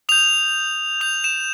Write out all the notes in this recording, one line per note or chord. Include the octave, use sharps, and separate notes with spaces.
D#6 G6 F7
D#6 G6 F7
E7